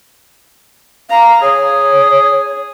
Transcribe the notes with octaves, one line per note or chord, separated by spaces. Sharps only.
F5 A#5
G#4 C#5